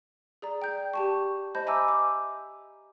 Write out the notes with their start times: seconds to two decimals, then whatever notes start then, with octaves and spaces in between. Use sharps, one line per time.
0.42 G#4 D5 A#5
0.62 G5 G6
0.94 G4 A5 C#6
1.55 C5 D#5 A5 B5 G6
1.67 E5 G#5 A#5 B5 D6 E6
1.88 D6